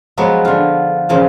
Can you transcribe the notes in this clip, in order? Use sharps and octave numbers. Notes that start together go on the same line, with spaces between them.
F3 F#3 G#3 B3
D3 F4
A#2 C#3 F3